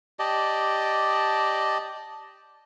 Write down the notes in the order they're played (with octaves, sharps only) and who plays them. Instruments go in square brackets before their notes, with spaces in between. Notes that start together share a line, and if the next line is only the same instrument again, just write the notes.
[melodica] G4 D5 D#5 A5